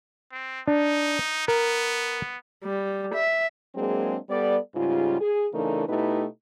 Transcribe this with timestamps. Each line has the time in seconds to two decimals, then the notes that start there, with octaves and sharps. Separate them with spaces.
0.32 C4
0.68 D4 D#4
1.48 B3 A#4
2.64 G3
3.15 E5
3.75 F#3 G#3 A#3 C4 D4 G#4
4.29 G3 B3 A4 D5
4.75 G#2 C#3 G3 F4
5.20 G#4
5.53 C#3 E3 A3 D4 D#4 A#4
5.88 B2 A3 D#4 E4 G4 B4